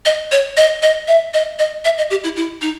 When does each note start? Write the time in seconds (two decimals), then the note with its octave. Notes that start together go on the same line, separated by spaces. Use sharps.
0.05 D#5
0.32 C#5
0.57 D#5
0.82 D#5
1.08 E5
1.34 D#5
1.59 D#5
1.85 E5
1.98 D#5
2.10 G4
2.24 E4
2.36 E4
2.62 D#4